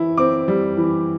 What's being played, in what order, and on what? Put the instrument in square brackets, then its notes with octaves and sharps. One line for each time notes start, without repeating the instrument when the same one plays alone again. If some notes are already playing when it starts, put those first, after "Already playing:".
Already playing: [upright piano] E3 E4
C4 D6
G3
E3